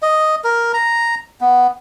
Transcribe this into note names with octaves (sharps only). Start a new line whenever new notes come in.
D#5
A#4
A#5
B3